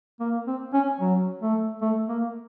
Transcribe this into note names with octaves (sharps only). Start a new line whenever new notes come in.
A#3
C4
C#4
F#3
A3
A3
A#3